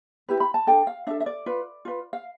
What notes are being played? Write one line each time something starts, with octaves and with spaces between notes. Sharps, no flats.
E4 G4 B4
B5
A5
D4 A4 G5
F5
D4 A4 E5
E5
D5
F4 B4
F4 B4
F5